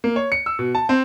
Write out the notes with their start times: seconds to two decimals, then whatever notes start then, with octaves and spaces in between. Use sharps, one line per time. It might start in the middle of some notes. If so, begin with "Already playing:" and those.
0.04 A#3
0.16 C#5
0.32 C#7
0.46 E6
0.59 B2
0.75 A5
0.89 C4